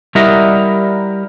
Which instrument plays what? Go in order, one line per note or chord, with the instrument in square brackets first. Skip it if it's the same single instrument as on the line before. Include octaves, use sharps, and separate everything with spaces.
[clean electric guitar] G3 E4 A#4 D#5 F#5 A#5